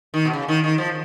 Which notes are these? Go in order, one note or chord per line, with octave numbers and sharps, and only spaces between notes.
D#3
B2
C#3
D#3
D#3
F3